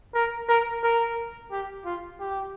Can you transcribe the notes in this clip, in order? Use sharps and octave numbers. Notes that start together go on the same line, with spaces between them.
A#4
A#4
A#4
G4
F4
G4